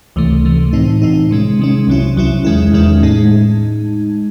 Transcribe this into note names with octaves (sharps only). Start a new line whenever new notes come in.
C#2 C3 E3 A3
C#2 C3 E3 A3
A2 E3 C4 D#4
A2 E3 C4 D#4
C3 D#3 G#3 C#4
C3 D#3 G#3 C#4
C2 C3 F#3 C#4 E4
C2 C3 F#3 C#4 E4
E2 D#3 G#3 C#4 E4
E2 D#3 G#3 C#4 E4
A2 G#3 D#4